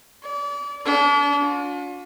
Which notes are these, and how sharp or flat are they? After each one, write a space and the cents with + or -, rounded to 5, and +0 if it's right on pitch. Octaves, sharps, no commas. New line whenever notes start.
D5 -35
D4 -40
F4 +45